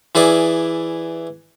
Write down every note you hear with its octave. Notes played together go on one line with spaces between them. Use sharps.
E3 E4 G#4 D5